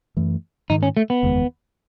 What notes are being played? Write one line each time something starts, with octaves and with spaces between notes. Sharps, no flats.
F#2 E3 A3
G#2 D#3 G#3 D#4
C#4
A3
B3
F#1 E2 D#3 G#3